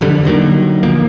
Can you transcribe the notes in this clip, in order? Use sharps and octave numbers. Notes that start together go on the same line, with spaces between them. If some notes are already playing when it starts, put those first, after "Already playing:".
E1 F2 D3 G3
D3 D#3 F#3 A#3
D2 A#2 F3 A#3